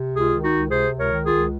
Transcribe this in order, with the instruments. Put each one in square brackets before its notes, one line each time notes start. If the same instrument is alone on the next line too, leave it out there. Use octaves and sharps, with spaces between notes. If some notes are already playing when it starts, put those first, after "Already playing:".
Already playing: [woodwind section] C3
C#2
F4 G#4
D#3
D#4 F#4
C#2
C3 G#4 C5
C#2
A#4 C#5
D#3
F4 G#4
C#2